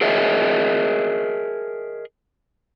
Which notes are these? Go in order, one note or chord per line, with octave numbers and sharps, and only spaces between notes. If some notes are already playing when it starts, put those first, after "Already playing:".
G#4 A#4 C#5 D#5 E5